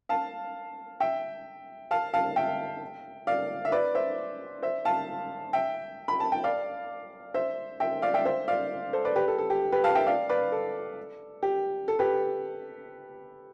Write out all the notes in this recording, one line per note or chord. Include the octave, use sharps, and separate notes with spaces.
F5 A5
E5 G5
F5 A5
F5 A5
E5 G5
D5 F5
E5
B4 D5
C5 E5
C5 E5
F5 A5
E5 G5
B5
A5
G5
D5 F5
C5 E5
E5 G5
D5 F5
E5 G5
C5 E5
D5 F5
A4 C5
B4 D5
G4 B4
A4
A4
G4
G4 B4
F5 A5
E5 G5
D5 F5
B4 D5
A4
G4
A4
G4 B4